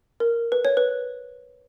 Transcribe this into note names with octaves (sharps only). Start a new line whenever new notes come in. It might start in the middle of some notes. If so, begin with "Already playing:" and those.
A#4
B4
C#5
B4